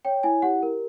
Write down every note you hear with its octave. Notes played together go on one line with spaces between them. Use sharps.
C#5 G5
E4 G#5
G4 F#5
A#4